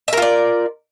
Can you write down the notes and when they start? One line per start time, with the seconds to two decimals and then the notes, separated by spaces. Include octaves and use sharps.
0.08 E5
0.13 A#4
0.17 F4
0.22 D5